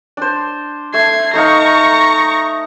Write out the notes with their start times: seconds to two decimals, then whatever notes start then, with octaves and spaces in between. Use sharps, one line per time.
0.17 D4 C5
0.94 A3 G#6 C7
1.33 A3 D#4 F5 A#5 C#6